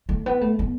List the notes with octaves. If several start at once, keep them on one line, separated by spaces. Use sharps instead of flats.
A3
B3
A3
B3